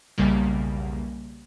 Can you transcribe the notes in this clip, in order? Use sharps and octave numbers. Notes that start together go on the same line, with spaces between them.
B1 E2 C#3 G3 A#3